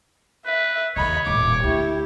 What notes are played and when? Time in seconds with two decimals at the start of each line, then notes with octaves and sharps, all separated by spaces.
0.46 B4 E5
0.96 D#2 C#3 C#5 D#5 B5
1.27 D#1 A2 D6
1.63 D2 E4 G4